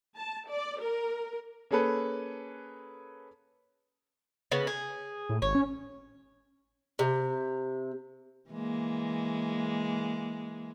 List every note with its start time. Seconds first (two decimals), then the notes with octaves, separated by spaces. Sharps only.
0.17 A5
0.51 D5
0.82 A#4
1.71 A#3 C#4 G#4 A4 B4
4.52 C#3 B3
4.67 G#4
5.29 A2
5.42 G#1 C#5
5.55 C#4
6.99 C3
8.50 E3 G#3 A#3